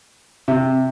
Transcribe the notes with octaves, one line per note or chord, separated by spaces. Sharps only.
C3